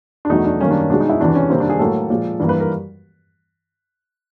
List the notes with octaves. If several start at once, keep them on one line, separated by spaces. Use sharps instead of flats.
D4
E2 B2 F#3 A3 D#4
D4
F#2 D#3 G3 A#3 C#4
D4
B2 G#3 D4
D#4
E4
E2 C3 E3 D4
C#4
C3 D#3 G3 A#3 C4
D4
G#4
A2 F#3 A#3 A4
A#2 F3 G#3
G2 E3 G3 A#3
B4
A#4